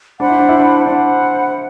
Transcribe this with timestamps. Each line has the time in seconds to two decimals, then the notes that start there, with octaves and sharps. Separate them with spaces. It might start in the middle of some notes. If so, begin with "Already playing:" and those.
0.20 D4 C5 F#5 B5
0.29 E4
0.39 D4
0.49 E4
0.59 D4
0.86 D4 C5 F#5 B5